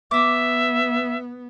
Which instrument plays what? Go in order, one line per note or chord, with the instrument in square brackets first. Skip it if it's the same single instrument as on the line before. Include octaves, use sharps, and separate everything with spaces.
[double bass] B3 [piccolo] E5 [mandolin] D6 D#6